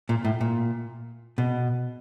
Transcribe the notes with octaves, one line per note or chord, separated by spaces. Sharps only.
A#2
A2
A#2
B2